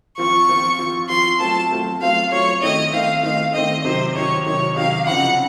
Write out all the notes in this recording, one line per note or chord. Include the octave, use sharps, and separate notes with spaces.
F3 C4 F4 C#6
F3 C4 F4
F3 C4 F4
F3 C4 F4 C6
F#3 A3 C4 F4 A5
F#3 A3 C4 F4
F#3 A3 C4 F4 F5
F#3 A3 C4 F4 C#5
D#3 A3 C4 D#4 D#5
D#3 A3 C4 D#4 F5
D#3 A3 C4 D#4 F5
D#3 A3 C4 D#4 D#5
C3 D#3 F#3 C5
C3 D#3 F#3 C#5
C3 D#3 F#3 C#5
C3 D#3 F#3 F5
C#3 F3 C4 D#4 F#5